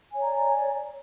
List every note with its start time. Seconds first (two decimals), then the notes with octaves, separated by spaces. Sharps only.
0.11 G#5
0.16 C#5
0.21 A#5
0.25 D5